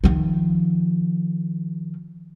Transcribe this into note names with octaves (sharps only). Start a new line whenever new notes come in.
D#3 F3